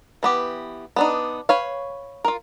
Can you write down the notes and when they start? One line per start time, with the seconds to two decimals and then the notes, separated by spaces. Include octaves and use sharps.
0.23 E3 B3 G4
0.96 B3 D4 D#4
1.49 B4 C#5 F5
2.24 F4 A#4